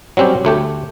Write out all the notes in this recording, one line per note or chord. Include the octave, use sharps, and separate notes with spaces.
F#3 G3 C4 C#4 G4
D2 A3 G4